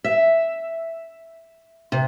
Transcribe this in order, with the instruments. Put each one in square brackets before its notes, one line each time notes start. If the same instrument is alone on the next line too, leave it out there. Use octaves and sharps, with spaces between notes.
[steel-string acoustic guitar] E5
C3